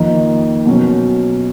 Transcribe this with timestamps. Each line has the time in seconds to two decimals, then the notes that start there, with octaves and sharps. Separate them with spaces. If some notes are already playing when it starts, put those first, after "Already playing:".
Already playing: F2 D#3 A#3 D#4
0.65 B2 F#3 C#4